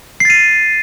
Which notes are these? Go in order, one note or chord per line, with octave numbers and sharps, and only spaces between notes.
A6 C7 D#7